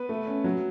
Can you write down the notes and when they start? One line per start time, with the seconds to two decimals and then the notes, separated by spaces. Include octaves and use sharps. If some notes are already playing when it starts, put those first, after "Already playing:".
Already playing: B3 B4
0.09 A3
0.27 C#4
0.44 F#3